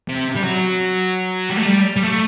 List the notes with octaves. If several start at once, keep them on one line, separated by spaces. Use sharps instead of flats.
C3
G3
F#3
G3
A3
G3
G3
A3